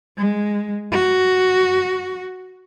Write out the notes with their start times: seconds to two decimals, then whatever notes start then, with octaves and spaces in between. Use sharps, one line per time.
0.17 G#3
0.92 F#4